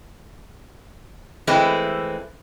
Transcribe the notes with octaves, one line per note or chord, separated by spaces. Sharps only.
E3 G#3 A3 C4 E4